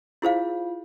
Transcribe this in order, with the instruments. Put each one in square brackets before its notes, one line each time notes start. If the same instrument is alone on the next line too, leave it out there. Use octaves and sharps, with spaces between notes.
[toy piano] E4 G#4 C5 F5 [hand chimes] F4